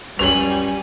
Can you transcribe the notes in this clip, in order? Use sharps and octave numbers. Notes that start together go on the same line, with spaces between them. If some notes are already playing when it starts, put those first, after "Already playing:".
C#2 F#2 G3 C#5 G#5 F7 F#7